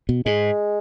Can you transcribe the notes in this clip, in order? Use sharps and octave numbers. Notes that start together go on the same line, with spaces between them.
B2
G#2 G#3